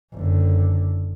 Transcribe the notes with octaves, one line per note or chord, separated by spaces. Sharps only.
F#1 D3